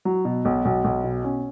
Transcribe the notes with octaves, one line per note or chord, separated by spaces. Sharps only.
F#3
B2
B1
B1
B1
B2
C#4